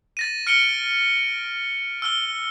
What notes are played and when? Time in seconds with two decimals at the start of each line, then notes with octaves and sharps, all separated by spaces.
0.17 A6 A#6 D#7
0.47 F6 C#7 D7 G7
2.02 E6 F6 G7